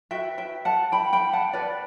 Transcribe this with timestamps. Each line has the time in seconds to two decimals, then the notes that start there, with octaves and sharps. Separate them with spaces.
0.11 F#4 B4 E5 G5
0.38 E5 G5
0.65 F#5 A5
0.92 G5 B5
1.13 G5 B5
1.33 F#5 A5
1.53 B4 D5